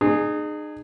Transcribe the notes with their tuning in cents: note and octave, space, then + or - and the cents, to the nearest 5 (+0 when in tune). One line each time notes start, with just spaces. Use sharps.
D#4 -40 G#4 +0